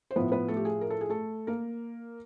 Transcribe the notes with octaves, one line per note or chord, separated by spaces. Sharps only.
C5
A2 F3 B3 B4
B3 B4
A3 A4
G4
G#4
A#4
A4
G#4
A3 A4
A#3 A#4